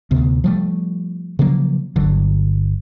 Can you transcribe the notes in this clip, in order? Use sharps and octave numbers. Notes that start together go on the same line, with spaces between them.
D2 C3 B3
F3 G3 A3
C#3 F3 F#3 A#3
G1 D3 F#3